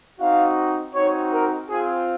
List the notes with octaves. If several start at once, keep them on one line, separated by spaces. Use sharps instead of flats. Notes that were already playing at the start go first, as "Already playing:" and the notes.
C4 D#4 F#4 F5
C4 D#4 F#4 C#5
A#4
C4 F4 G#4